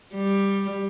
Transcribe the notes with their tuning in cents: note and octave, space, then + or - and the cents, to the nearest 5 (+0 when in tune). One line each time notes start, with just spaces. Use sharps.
G3 +10